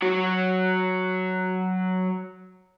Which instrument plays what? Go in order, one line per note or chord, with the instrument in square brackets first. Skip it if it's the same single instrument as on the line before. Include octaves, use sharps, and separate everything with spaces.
[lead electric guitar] F#3 F#4